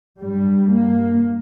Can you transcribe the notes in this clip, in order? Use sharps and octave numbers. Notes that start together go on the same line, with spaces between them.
G2 G3
A#3